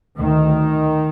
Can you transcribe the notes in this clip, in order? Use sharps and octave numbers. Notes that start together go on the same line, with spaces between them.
D2 D#3